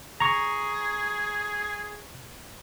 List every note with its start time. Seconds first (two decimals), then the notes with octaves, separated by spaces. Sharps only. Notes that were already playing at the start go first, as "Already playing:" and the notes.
0.20 G#4 A#5 C#6